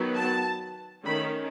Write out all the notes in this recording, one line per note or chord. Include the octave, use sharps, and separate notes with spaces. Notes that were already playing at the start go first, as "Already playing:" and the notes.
Already playing: D#3 F#3 B3
A5
D#3 A3 C#4 B5